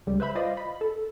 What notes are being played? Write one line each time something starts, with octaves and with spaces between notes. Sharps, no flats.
C#2 G3
B4 C5 E5 B5
F4 C5 D5 D#5 F5
B5
A4